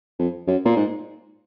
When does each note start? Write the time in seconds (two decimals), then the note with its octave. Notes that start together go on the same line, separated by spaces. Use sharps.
0.19 F2
0.47 F#2
0.65 A#2
0.76 G#2